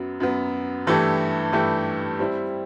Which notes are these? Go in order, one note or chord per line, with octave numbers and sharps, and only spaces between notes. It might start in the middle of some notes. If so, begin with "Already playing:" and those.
Already playing: F#2 F#3 B3
F#2 F#3 B3
G2 E3 A3 E4 G4
G2 E3 A3 E4 G4
G3 C4 E4